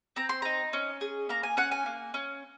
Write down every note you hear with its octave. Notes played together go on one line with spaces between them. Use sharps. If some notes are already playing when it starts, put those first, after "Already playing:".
C4 A#5
C6
D#4 A#5
C#4
G#4
A#3 A#5
G#5
C#4 F#5
G#5
A#3
C#4